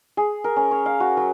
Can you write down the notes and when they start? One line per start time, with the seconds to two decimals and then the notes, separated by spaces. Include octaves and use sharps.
0.17 G#4
0.44 A#4
0.56 C#4
0.71 C#5
0.86 F5
1.00 F#4
1.17 F#3